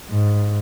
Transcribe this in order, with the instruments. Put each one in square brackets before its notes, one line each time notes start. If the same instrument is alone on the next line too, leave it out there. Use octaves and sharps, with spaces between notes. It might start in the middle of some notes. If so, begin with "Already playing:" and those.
[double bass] G#2